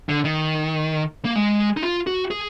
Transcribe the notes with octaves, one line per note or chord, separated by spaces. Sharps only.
D3
D#3
A#3
G#3
D#4
F4
F#4
G#4